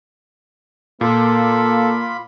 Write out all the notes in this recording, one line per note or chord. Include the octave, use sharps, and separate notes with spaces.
A#2 A#3 F4 A4 B5